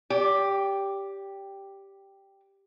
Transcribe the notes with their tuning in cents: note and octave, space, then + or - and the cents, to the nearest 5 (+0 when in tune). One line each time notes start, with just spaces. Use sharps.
G4 +0 D5 -40